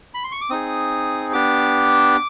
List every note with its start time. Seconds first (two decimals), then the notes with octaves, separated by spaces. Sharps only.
0.14 B5
0.24 C6
0.32 C#6
0.41 D6
0.50 C4 D#4 G#4 D#6
1.33 B3 D4 G4 D6